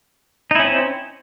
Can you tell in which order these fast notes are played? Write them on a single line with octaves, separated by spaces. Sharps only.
D#4 E4 C#4 C4